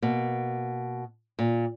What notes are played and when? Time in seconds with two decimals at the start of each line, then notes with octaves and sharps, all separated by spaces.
0.02 B2 A#3
1.39 A#2